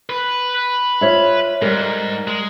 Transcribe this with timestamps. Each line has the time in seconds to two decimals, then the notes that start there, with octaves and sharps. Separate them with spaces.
0.10 B4
1.01 F4 C#5 E5
1.62 G#2 G3 A#4
2.27 G#3